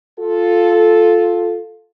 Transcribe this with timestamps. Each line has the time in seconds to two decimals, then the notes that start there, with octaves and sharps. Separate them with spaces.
0.19 F4 A4